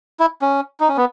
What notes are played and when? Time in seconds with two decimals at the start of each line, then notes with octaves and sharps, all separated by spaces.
0.20 E4
0.42 C#4
0.80 D#4
0.89 C#4
0.97 B3